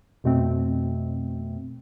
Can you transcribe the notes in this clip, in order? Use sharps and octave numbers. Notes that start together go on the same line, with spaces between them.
F2 B2 A3 C4